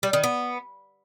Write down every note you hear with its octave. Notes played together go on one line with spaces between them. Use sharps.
G3
D#3
B3